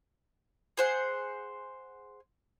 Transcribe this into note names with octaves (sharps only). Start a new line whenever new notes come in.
G#4 C5 F#5